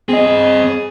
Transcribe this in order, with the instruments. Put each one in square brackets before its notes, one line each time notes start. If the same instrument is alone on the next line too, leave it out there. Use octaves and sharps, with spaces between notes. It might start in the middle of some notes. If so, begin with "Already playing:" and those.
[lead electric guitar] C4 D#5 [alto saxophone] G#4